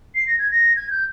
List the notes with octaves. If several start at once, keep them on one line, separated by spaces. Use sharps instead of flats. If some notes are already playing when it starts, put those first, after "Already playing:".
C7
A#6
G#6
A#6
G#6
G6